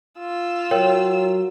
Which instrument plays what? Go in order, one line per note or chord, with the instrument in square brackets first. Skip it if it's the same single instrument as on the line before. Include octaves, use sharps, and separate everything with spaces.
[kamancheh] F4 E6
[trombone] F#3 [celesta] A#4 C#5 G5